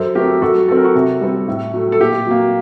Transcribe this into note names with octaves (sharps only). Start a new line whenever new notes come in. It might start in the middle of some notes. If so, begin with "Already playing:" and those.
Already playing: F#2 A4 C5
F#3 A3 C4 G4 A#4
F#2 F#4 A4
F#3 C4 A4
A#4
F#4 A4
C3
G3 C4
A2
F#3 A3
A4
A#2 G4
F#3 A#3